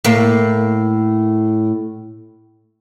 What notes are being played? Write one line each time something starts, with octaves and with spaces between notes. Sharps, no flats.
A2 A#3